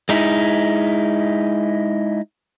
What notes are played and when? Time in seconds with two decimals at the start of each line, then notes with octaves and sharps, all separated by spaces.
0.09 G#3 D#4 E4